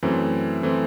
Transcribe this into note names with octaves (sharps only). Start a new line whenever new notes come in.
F#2 E3 A3 C4
E3 A3 C4